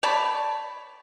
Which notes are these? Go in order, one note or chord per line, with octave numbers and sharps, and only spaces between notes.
C#5 D5 A5 B5